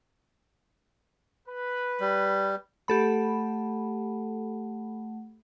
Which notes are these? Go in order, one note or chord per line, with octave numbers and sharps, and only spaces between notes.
B4
G3
A3 G4 A4 F#5 B5